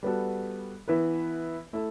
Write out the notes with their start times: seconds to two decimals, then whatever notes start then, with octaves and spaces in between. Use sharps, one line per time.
0.03 G3 B3 F#4 A4
0.88 E3 B3 E4 B4
1.73 A3 E4 A4